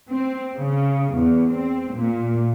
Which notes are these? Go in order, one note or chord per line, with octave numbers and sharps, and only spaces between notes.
C4
C#3
E2
C4
A#2